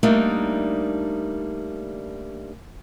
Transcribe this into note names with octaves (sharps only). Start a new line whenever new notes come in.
G3 A3 A#3 D4 D#4